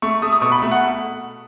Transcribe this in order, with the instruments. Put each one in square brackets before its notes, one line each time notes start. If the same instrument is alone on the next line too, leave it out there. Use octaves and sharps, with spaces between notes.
[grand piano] A3 C#6
A3 D#6
D#6
B2 C#6
B5
A3
F#5